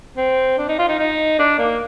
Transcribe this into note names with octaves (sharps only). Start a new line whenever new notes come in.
C4
D4
D#4
F4
D#4
D#4
D4
A#3